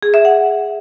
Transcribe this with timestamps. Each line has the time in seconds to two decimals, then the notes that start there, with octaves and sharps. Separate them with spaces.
0.03 G#4
0.14 E5
0.25 F#5